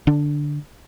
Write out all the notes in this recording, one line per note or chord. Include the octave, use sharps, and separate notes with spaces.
D3 D4